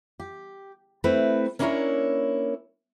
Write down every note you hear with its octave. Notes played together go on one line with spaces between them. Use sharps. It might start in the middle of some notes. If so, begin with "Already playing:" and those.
G4
A3 C4 E4 B4
A#3 C#4 D4 E4 A#4 C#5